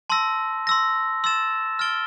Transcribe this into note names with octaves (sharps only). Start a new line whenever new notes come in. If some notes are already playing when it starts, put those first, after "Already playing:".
A5 C6 E6 A#6
C6 E6 A#6
C6 E6 A6 E7
F6 A6 D7 G7